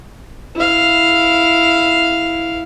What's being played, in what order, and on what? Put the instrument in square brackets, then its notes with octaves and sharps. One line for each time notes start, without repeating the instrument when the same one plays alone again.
[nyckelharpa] E4 F5